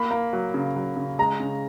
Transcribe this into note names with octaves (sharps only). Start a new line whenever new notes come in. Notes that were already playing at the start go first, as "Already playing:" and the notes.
Already playing: A#3 B5
A#3
F#3
C#3
F#3
C#3
G#3 A#5
C#3